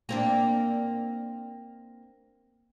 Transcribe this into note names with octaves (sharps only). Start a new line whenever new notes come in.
A#3 C4 D4